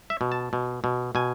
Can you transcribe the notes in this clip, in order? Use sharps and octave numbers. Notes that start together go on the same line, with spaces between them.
E5
B2
A5
B2
B2
B2 G#5